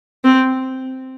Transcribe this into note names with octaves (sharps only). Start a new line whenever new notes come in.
C4